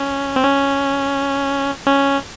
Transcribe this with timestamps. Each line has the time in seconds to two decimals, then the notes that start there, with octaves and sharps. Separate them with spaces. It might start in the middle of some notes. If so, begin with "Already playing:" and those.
Already playing: C#4
0.36 C4
0.43 C#4
1.86 C#4